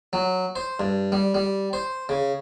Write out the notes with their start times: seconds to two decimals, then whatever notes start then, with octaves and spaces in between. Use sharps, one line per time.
0.13 F#3
0.56 C5
0.80 G2
1.12 G3
1.34 G3
1.73 C5
2.09 C#3